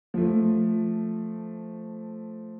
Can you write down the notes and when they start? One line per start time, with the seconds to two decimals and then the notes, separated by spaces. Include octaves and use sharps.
0.14 F3 A3